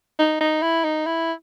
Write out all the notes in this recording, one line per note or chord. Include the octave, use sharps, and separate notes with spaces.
D#4
D#4
E4
D#4
E4